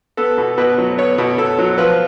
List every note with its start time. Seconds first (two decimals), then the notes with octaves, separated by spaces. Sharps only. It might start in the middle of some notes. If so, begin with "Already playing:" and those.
0.17 B3 A4
0.38 B2
0.58 B2 B4
0.78 F#3
0.98 B3 C#5
1.18 B2
1.38 B2 A4
1.58 F#3
1.78 F3 B4